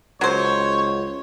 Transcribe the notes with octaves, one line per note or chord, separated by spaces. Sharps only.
C#2 F#3 C5 C#5